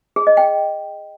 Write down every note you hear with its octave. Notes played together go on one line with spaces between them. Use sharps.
G#4
D#5
G5